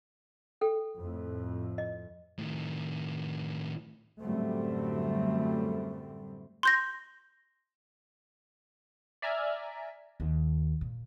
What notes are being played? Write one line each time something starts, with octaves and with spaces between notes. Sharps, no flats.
A4 G5
F2 A2
D#5
A2 D#3
F#2 A2 D3 G3 A3 C4
C6 G6 A#6
D5 E5 G#5 A#5 F6
D#2
A#2